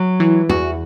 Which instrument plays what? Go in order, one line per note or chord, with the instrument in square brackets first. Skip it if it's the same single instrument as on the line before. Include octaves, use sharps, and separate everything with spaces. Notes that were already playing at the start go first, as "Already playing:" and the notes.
Already playing: [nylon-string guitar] F#3
[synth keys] E3
[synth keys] E2 [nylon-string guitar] F#4